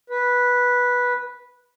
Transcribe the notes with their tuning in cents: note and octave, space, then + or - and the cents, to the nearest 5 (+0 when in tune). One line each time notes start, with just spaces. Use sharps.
B4 -10